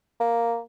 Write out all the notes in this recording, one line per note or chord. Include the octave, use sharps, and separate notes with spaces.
A#3